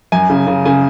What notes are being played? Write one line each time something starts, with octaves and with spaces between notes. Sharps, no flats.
F#2 G#5
C#3
C#3
C#3 G#5